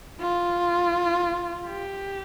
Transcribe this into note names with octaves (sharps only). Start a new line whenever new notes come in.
F4
G4